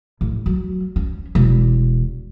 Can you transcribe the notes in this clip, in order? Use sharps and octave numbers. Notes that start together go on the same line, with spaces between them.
A1
F#3
C#4
E1